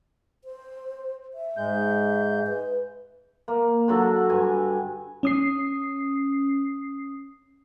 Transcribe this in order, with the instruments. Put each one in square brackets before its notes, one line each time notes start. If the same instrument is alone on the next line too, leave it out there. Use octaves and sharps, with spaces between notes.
[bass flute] C5
E5
[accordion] G#2 G#3 G6
[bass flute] B4
[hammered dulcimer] A#3
D3 F#3 A4
G2 G#5
[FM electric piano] C#4 D#6 C7